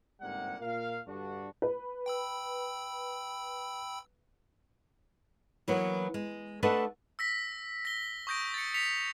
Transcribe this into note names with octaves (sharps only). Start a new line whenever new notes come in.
G1 G#2 C3 G3 A#3 F#5
A#2 A#4 F5
G2 D3 D4 F#4
B4
G5 B5 E6
E3 F#3 A#3 B3
G#3
A3 D4 A4 B4 D#5 F#5
E6 A#6 B6
A#6 G7
C#6 D#6 G6 A#6 D7
A6 C#7
B6 C#7 F7